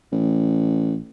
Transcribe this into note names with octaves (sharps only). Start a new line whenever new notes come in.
A1